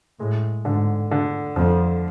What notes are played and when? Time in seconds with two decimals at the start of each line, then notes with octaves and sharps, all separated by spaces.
0.20 A2 G#3
0.65 G#2 D3
1.11 D3
1.56 F2 F3